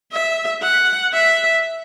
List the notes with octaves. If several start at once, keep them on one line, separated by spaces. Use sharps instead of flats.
E5
F#5
E5